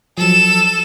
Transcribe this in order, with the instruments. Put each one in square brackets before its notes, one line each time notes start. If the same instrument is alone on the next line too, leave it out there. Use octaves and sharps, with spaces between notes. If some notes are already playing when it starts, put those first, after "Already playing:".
[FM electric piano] F3 F#3 [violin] A4 E7